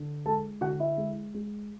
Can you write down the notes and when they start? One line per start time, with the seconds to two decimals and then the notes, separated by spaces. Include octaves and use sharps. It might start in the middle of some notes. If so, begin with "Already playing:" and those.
Already playing: D3
0.26 G#3 A4 A5
0.61 D3 F#4 F#5
0.80 E4 E5
0.98 G#3
1.34 G#3